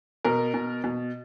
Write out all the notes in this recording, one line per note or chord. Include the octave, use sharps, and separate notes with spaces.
B2 A#4
B2
B2